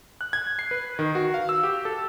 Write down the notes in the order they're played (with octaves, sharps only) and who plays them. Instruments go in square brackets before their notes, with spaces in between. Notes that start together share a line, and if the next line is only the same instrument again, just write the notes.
[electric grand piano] F#6
G#6
C7
B4
D#3
F#4
F5
E6
G4
A4